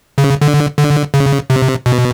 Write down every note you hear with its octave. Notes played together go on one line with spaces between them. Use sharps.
C#3
D3
D3
C#3
C3
B2